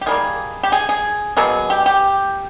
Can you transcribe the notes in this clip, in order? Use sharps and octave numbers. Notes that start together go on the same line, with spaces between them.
G4
D#3 G3 A#3 G#4
G4
G#4
G#4
B2 F#3 A#3 G#4
G4
G4